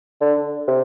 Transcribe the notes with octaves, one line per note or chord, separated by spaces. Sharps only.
D3
C3